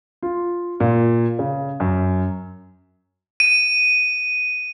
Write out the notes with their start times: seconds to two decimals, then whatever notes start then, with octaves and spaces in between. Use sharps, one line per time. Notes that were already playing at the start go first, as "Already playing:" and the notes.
0.22 F4
0.80 A#2
1.39 C#3
1.80 F#2
3.40 D#7